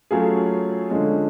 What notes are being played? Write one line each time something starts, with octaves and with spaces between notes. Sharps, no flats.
F#3 A3 C#4 F4 G#4
D3 F3 G#3 C#4